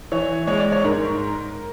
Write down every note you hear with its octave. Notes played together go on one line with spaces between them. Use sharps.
E3 C#5
G#3 C#5
D5
C#5
G#2 A#4